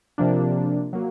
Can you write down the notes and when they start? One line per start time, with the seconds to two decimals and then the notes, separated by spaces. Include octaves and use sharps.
0.18 C3 F3 A#3 D4
0.93 F#3 A#3